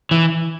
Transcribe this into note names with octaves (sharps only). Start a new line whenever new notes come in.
E3